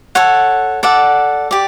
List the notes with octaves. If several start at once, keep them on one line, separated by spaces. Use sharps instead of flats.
A4 C#5 F#5
A4 D5 F#5
G4 D5